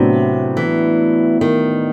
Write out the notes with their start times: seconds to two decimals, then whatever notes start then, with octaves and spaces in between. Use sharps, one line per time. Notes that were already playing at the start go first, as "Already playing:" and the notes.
Already playing: A2 C3 F#3 B3 D4
0.57 E3
1.41 D#3